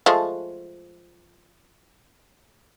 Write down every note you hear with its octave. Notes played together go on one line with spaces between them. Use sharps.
F3 G#3 A3